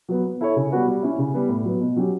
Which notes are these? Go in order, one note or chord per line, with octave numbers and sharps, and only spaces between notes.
F#3 B3
B3
E4 A4 C#5
C#3
G3 B3 F#4 B4
G3
C#4 E4
C#3
G3 B3
A2
F#3 B3
B2
F#3 C#4 G4